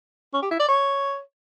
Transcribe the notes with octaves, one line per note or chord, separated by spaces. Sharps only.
C#4
G4
E4
D5
C#5